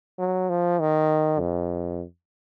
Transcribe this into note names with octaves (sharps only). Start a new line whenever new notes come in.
F#3
F3
D#3
F2